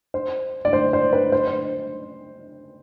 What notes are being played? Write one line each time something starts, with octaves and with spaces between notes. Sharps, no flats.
C5
D5
C5
C5
B4
C5
C5